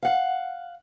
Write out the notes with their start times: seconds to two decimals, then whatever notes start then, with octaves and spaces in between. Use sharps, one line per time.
0.03 F5 F#5